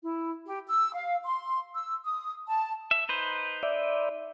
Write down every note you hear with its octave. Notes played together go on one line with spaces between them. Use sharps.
E4
G4
E6
F5
C6
E6
D#6
A5
E5
D#4 B4 C5
D5 E5